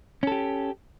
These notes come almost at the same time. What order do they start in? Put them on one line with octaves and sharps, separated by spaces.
C#4 A4 G4